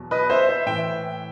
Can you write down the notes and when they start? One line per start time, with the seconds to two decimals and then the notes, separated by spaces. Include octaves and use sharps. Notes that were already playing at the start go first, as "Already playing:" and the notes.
Already playing: E2 B2 F#3
0.11 B4 D#5
0.30 C5 E5
0.49 C5 E5
0.66 A2 E3 E5 G5